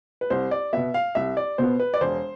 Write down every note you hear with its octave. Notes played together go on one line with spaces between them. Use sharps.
B4
C2 C5
D5
B2 B3 E5
F5
C2 E5
D5
B2 B3 C5
B4
D5
E1 C5